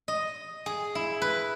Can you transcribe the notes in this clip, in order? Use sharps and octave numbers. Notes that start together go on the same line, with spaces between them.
D#5
G#4
E4
B4